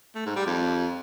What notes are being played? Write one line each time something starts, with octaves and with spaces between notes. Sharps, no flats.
A3
G#2
G3
F2